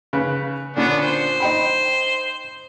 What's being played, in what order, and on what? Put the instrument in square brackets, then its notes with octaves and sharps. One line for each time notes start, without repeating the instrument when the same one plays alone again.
[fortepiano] C#3 B4
[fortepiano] A#2 D3 C#4 [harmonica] B3 D4
[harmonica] C5
[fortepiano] D#4 G5 B5